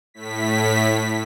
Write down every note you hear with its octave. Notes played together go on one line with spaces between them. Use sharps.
A2 B6